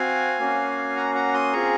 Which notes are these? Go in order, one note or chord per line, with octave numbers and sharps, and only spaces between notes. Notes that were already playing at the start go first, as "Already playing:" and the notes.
Already playing: C4 F#4 F5 G#5
A#3 C#4 F#4
F#5 A#5
F#5 A#5
C6 D#6
C4 F4 G#4 A#5 C#6